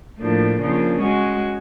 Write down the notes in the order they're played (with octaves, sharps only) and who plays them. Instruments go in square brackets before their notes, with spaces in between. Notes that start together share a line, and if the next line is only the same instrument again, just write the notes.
[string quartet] A2 F3 A#3 D4
C#3 F3 A#3 D4
G#3 C#4 F#4